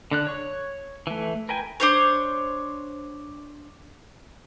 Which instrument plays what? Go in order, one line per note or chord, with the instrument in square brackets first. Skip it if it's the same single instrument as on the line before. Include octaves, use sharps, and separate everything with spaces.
[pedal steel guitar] D3 D4 F#6
C#5 C#6
E3 A3
A#4 B4 G5 G#5
[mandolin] D4 C5 C#5